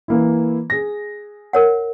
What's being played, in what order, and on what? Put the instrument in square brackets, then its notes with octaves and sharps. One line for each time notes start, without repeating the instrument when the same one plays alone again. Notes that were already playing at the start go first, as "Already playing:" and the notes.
[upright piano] E3 A#3 E4
G#4 A#6
[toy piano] A#4 C#5 F#5